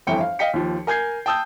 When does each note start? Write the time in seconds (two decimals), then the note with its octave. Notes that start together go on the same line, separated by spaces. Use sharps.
0.07 G1 F2 E3 G5 C#7
0.21 F5
0.39 D#5 F5 G5 B6 C#7
0.54 D#2 F3
0.87 A#4 G#5 G6 G#6 C7
1.26 G5 A5 D#6 E6 G6